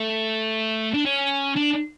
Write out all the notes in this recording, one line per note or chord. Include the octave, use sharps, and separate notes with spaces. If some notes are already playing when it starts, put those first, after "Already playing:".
Already playing: A3
D4
C#4
D4